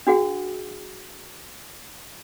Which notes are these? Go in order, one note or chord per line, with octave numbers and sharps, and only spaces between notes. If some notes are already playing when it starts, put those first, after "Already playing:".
D4 F#4 G#4 F#5